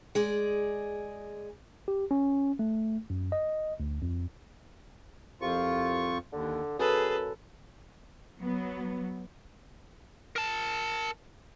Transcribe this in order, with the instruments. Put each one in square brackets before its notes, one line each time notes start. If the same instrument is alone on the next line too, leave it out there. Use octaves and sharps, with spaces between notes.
[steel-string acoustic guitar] G#3 G#4 D5
[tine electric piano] G4
C#4
A3
F#2
D#5
D2
F2
[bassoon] C2 [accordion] F2 F4 C#6
[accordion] D#2 [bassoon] D3
[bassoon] F#2 [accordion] G#4 [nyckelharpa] A4 B4
[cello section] F#3 B3
[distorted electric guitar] A#4 A5